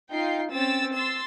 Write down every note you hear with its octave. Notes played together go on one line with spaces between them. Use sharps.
D#4 F4 G5 C7
C4 C#4 E6 A6
C6 E6 A6